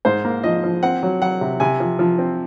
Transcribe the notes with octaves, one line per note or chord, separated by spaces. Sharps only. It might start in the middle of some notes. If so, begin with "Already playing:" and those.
G#2 C5
A#3
F3 D#5
F3
C4 F#5
F#3
F#3 F#5
C3
C3 G#5
F3
F3
C4